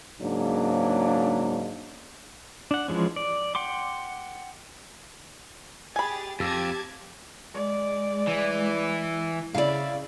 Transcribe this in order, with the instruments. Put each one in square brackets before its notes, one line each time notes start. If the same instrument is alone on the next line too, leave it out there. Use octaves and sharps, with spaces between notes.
[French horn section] G#2 C#3 F#3 A#3 D4
[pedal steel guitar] D4 F#5
E3 F3 G#3 C#4
D5
F#5 G5 C6 D6
[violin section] G4 G#4 A6 [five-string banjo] G#5 B5
[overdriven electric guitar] F2 [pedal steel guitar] G4 E6 [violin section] A5 D6 G#6
[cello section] G#3 [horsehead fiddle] D5
[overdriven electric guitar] E3
[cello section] C#3 [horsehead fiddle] E4 [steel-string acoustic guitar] D5 F5